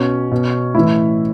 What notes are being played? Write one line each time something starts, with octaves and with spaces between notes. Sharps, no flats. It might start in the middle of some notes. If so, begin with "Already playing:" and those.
Already playing: B2 C#4
B2
A2 E3 E4